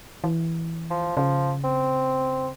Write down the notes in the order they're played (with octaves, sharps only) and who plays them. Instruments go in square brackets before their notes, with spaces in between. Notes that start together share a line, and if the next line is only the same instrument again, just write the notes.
[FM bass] E3
[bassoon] F3
[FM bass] C#3 [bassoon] F3
[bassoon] C4